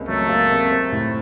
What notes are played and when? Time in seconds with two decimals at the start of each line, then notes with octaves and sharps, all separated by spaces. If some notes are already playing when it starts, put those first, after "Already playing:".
Already playing: C#2 C3 A#3
0.08 F#3 A3
0.29 A#3
0.50 C3
0.71 C4
0.92 A2